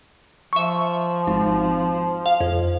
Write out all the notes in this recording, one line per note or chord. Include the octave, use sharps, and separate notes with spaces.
F3 E5 C#6
G#1
F5
F2